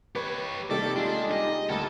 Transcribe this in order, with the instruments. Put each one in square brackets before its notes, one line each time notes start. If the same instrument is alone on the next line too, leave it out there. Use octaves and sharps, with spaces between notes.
[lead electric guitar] G4 C#5 [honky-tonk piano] B4
[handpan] C3 A#3 G4 [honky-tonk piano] D#3 G3 A3 [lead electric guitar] A4 [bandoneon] D6
[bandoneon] G#3 [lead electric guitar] D4 [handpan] F4
[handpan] D#4 G4 [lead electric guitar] D#5
[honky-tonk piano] D2 [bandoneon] A#2 G3 [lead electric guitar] A4